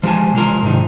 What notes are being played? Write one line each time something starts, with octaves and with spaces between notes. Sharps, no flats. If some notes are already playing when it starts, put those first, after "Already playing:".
F3 G#3 G4 G#5 A5
C3 G#3 F4 A#4
G#2 C3 D#3 D#4